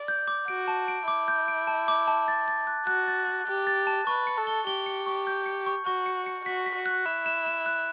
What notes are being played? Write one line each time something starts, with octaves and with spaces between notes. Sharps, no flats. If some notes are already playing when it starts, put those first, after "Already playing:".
Already playing: D5
G6
D6
F#4 D7
A5
D7
E4 D6
G6
D7
A5
D6
A5
A6
A6
F#6
F#4 F#6
A6
F#6
G4 F#6
A6
A5
B4 C#6
C#7
A4
G7
G4 G7
C#7
C#6
G6
C#7
C#6
F#4 C#6
C#7
C#7
F#4 B6
B6
F#4
F#6
E4 E7
E7
E7
F#6